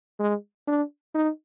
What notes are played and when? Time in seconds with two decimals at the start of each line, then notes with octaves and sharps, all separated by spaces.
0.20 G#3
0.67 D4
1.15 D#4